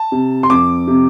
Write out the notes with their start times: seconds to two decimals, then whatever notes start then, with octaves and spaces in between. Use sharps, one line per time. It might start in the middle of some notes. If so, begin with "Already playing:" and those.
Already playing: A5
0.12 C3
0.43 C6
0.50 F2 D6
0.88 C3